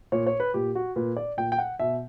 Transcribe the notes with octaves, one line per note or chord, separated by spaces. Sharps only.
A#2 C#5
C#5
B4
A#2 G4
F#4
A#2 B4
D5
A#2 G5
G5
F#5
B2 E5